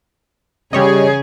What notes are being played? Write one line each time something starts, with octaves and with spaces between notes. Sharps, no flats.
C#3 G3 G#4 C#5 D#5